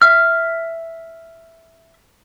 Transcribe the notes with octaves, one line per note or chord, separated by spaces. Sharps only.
E5 F6